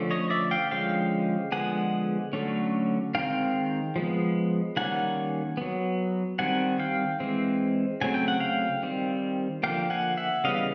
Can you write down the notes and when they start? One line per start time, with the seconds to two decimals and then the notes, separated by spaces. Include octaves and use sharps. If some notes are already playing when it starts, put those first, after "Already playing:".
Already playing: D3 F3 A3 C#4
0.11 C#5 D#5
0.30 D5 E5
0.51 F5 G5
0.71 D3 F3 G#3 C#4 F5 G5
1.52 D3 F3 G#3 B3 F#5 G#5
2.33 D3 F#3 A3 C#4
3.15 D#3 G#3 C4 F5 G5
3.96 F3 G#3 B3
4.77 D#3 G3 A#3 C#4 F#5 G#5
5.57 F#3 B3
6.39 D#3 G3 C4 F#5 G#5
6.79 F5 G5
7.20 E3 G#3 C4
8.01 C#3 F#3 A3 C4 G#5
8.14 G5
8.28 F#5
8.40 F5 G5
8.83 D#3 G3 C4
9.63 D3 F3 A#3 F5 G5
9.90 F#5 G#5
10.17 E5 F#5
10.44 C#3 E3 G3 B3 D#5 F5